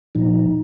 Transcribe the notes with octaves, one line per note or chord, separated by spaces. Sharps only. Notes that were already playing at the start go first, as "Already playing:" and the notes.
A#2 F3 D#4